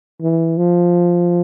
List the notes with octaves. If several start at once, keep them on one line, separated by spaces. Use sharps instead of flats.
E3
F3